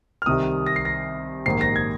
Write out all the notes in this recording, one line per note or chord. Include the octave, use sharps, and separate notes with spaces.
F6
C2 C3 D#3 G3 D#6
A#6
C7
A#6
A#1 G#2 D#3 A#3 C7
A#6
G#6